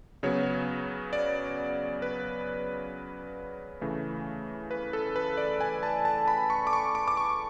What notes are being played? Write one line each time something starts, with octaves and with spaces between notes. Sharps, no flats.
C#3 F#3 B3 C#5
D5
B4
C#3 E3 A3
B4
A4
B4
D5
G#5
A5
A5
B5
C#6
D6
C#6
D6
D6
C#6